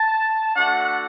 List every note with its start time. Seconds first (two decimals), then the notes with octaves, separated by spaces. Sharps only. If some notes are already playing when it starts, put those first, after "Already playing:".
Already playing: A5
0.55 A3 D4 F#4 F#5